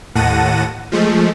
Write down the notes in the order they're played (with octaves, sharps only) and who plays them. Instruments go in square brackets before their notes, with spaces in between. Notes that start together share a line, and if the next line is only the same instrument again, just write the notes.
[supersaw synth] D#2 A2 F#5 A5 A#6 D#7
F3 G#3 A3